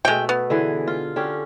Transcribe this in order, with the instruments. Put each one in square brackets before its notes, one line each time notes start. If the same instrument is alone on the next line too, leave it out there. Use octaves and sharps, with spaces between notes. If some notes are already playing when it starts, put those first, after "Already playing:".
[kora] B2 A3 [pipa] G#3 G5
[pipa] B3
[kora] D3 E3 G#4
F4
D3 C#4 G4